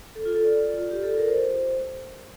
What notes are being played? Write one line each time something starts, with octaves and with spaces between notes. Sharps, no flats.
A4
F4
A4
D5
F4
G4
A4
A#4
C5